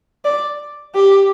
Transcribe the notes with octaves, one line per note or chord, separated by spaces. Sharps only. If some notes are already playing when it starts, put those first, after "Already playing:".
D5
G4